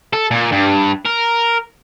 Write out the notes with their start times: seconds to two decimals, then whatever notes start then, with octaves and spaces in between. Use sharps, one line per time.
0.13 A4
0.31 A#2
0.52 G2
1.06 A#4